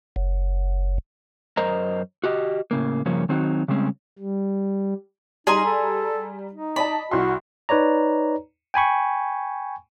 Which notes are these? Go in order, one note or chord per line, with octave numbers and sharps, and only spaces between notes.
F#1
F#2 A#4 C5 D#5 A#5
F#4 G4 D#5
A2 C#3 A#3
G2 C#3 F3 A#3 C#4
D#3 F#3 C4 D#4 F#4
C#3 G3 G#3 C4 C#4
G3
G3 D#4 G#4 G#5 A#5 C6
A4
D#4
D5 D#5 A5 B5
C2 F#4 C6
D#4 B4 C#5 D5 A#5
G5 G#5 B5 C#6